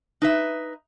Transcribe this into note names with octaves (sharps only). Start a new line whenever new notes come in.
D#4 B4 E5